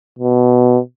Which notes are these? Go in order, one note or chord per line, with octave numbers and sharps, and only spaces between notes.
B2